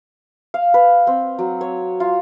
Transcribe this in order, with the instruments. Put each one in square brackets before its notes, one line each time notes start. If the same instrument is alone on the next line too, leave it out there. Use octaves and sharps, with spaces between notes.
[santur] F5
B4
C4
F#3
C#5
F4